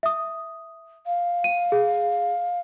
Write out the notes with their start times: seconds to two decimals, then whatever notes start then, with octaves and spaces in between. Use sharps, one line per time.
0.03 E5 D#6
1.06 F5
1.44 D#7
1.72 G#4